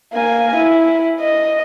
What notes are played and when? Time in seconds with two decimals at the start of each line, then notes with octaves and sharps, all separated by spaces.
0.14 A#3 G#5
0.56 E4
1.21 D#5